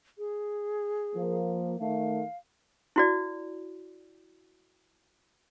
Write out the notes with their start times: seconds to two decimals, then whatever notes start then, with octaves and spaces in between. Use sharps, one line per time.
0.18 G#4
1.15 F3 A#3
1.80 D#3 A3 F5
2.96 E4 F#4 D5